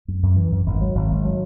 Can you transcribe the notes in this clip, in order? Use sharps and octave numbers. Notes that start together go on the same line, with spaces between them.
F#2
F#2
E3
F#2
G#1
F#3
G#1
G#1
F#3